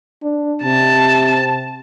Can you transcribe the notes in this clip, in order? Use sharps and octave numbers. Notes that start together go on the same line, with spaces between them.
D4
C3 A5